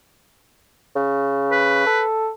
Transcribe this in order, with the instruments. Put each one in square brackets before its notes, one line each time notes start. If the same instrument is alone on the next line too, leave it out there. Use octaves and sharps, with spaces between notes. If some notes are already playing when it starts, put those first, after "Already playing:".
[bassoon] C#3
[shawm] B4
[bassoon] A4